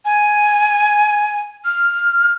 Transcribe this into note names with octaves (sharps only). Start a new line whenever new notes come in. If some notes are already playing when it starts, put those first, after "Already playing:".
G#5
F6